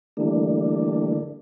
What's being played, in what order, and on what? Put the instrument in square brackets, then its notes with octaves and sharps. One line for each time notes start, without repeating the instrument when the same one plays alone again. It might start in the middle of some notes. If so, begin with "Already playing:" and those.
[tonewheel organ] D3 E3 G3 A3 A#3 D4